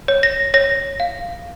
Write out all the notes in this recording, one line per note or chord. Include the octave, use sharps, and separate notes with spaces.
C#5
A#6
C#5 A#6
F5